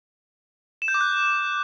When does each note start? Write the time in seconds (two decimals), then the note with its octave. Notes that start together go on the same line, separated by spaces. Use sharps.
0.82 E7
0.88 G6
0.94 D6
1.01 F#6